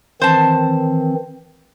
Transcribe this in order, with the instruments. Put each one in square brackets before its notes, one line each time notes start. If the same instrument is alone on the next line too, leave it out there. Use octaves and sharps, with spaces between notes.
[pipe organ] D#3 E3 C4 [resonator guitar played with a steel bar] C5 A5